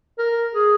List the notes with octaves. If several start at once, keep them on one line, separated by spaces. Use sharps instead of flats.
A#4
G#4